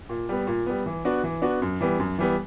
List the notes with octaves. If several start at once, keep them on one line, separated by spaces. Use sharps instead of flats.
A#2
G3 B3
A#2
G3 B3
E3
B3 D4 F#4
E3
B3 D4 F#4
F#2
E3 G3 B3
F#2
E3 G3 B3